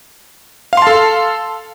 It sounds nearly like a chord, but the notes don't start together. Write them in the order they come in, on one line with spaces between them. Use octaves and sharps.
F5 C6 A5 A4